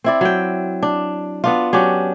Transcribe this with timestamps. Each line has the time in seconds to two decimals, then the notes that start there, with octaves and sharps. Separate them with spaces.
0.04 C4 E4 D5
0.21 F#3 G5
0.83 D4
1.44 B3 D4 F4
1.73 F#3 C#4 D4 G4